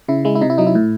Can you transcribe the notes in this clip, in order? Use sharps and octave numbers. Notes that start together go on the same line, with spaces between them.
C#3 E4
G#3 E4
E4
C3 D#4
E4
F#3 D#4
E4
A2